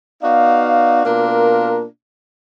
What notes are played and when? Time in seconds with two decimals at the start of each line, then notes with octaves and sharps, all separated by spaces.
0.22 B3 D#4 F#4 D5 F5
1.03 B2 A#3 D4 F4 A#4